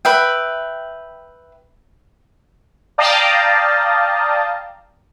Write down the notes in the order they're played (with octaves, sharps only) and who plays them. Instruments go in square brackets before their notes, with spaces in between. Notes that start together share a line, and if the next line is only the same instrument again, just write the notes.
[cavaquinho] B4 E5 G5
[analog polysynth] D5 F5 G5 A5 A#5 D#6